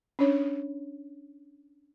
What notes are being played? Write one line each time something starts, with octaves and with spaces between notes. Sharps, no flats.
C#4 D4 C#5